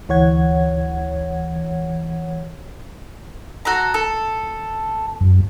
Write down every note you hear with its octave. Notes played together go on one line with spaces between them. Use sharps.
D2 E3 C#5 F#5 G#6
F#4 A4 A#5
A4
F#2